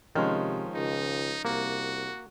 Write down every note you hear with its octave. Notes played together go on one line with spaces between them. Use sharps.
C3 D#3 F3 G#3 C#4 F6
C#2 D#4
C2 A#3 F#4